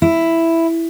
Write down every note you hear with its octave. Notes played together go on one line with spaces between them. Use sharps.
E4